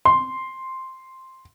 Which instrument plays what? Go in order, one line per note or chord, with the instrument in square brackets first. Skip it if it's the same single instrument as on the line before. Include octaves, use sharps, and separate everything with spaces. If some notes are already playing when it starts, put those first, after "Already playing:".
[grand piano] C6